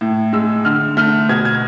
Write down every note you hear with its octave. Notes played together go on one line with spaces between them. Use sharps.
A2
G#3 E6
D3 F6
A3 F6
B2 G#6
G#6